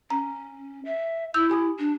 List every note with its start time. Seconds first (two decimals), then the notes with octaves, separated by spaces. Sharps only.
0.10 C#4 A#5
0.85 E5
1.34 E4 E6 G6 F7
1.50 G4 G#5 D#6
1.79 D4